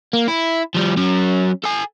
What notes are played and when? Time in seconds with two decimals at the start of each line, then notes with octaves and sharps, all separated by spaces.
0.13 A#3
0.28 E4
0.75 F3 G3
0.97 F#3 C#4
1.64 A4 G#5